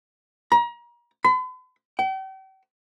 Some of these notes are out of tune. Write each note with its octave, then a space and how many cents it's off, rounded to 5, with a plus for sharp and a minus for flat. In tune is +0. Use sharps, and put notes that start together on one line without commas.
A#5 +35
B5 +45
G5 -40